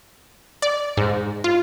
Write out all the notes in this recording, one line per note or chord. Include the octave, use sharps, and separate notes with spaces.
D5
G#2
F4